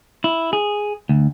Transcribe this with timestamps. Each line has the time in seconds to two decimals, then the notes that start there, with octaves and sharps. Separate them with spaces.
0.24 E4
0.53 G#4
1.09 D2